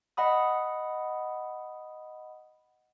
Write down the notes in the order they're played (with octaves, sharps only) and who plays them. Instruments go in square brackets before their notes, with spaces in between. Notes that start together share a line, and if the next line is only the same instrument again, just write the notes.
[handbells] D#5 F#5 B5 D#6